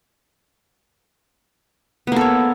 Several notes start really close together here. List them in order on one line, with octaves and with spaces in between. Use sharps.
B3 A#3 A4 C#5